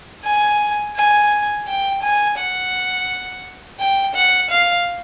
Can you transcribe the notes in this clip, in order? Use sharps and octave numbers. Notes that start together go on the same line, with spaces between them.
G#5
G#5
G5
G#5
F#5
G5
F#5
F5